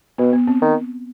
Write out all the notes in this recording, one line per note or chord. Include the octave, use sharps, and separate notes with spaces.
B2 B3
B3
C4
D#3